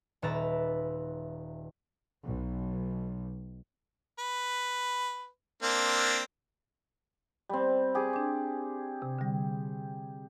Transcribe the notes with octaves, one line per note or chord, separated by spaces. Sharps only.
D#1 B4 E5 A#5 A6
B1
B4
A#3 C4 D4
G3 C4
G4 G#4
D4 D6
C3
D3 G3